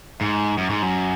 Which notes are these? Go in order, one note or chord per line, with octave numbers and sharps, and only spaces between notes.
G#2
F#2
G#2
F#2